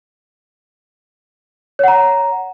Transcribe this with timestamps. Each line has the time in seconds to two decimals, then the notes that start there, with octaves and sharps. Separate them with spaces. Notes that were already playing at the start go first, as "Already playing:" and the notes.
1.79 C#5
1.84 F#5
1.88 A#5